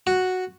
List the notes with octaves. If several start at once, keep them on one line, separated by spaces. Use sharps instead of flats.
F#4